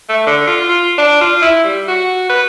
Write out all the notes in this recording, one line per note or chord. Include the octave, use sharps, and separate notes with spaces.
A3
D3
F4
F4
D4
F4
E4
G3
F#4
B4